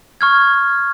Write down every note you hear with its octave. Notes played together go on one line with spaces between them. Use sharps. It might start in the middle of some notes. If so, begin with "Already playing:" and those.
C#6 F6 G#6